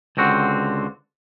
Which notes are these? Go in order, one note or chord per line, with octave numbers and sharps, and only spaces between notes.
C#2 D3 C4 F#4